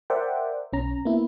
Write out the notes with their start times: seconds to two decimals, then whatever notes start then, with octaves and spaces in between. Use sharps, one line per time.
0.10 A#4 C5 D5 E5 F#5 G5
0.73 B1 C#4 A#5
1.05 A#3 B3 E4